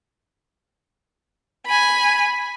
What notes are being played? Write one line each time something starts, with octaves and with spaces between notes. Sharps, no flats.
G#5 B5